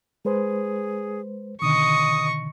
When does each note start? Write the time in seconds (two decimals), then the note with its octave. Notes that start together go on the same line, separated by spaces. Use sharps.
0.25 G#3 G#4 B4 C5
1.62 B2 D3 D#3 D#5 C#6 D#6